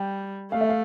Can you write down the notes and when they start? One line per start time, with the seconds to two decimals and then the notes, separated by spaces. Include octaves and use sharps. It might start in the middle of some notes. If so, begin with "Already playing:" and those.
Already playing: G3 G5
0.52 A3 F5
0.61 E5
0.69 F5